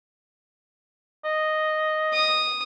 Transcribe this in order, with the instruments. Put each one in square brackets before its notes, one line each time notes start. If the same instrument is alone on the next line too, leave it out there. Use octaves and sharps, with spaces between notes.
[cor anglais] D#5
[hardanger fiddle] D#6